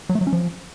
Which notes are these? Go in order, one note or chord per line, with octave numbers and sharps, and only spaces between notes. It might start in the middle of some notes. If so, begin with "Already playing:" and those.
F#3
A3
F#3
C#4
F3